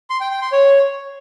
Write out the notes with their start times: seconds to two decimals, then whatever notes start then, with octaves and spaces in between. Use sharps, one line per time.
0.10 C6
0.21 G5
0.31 G5
0.42 C6
0.52 C#5